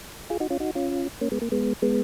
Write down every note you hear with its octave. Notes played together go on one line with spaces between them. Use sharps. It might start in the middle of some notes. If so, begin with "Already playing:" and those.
F4 G#4
D#4 F#4
C#4 F4
D#4 F#4
C#4 F4
A#3 C#4
G#3 B3
A#3
G#3 B3
G#3 B3